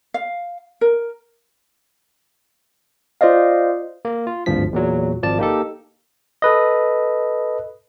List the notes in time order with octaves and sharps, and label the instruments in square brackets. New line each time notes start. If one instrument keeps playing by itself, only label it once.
[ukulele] F5
A#4
[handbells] F4 C5 D5 D#5 F5
[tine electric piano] A#3
F4
G#1 D2 G2 F3 B6
E2 A#2 F#3
G#1 F3 D5 A5
A#3 D#4 G4 A4
A4 B4 D#5